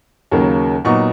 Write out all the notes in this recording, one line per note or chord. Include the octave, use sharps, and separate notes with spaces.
D#2 C#3 F#3 A#3
A#2 F#3 B3 D#4 C#6